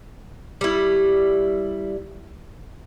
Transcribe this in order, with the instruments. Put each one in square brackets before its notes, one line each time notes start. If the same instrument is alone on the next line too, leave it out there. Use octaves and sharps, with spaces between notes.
[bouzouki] G3 E4